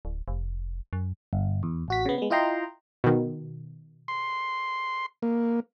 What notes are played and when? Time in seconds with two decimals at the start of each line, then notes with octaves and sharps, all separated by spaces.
0.05 D1
0.28 F1
0.93 F#2
1.33 G1
1.63 E2
1.88 A1 F#4 B6
2.06 C#3 B3
2.18 G#3 B3
2.30 E4 F4 D#5 G5 A#5 C6
3.04 B2 D#3
4.08 C6
5.22 A#3